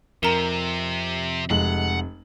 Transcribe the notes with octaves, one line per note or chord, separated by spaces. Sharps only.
F2 C3 A#4 A#5 E7
F1 G#3 F#5 F#7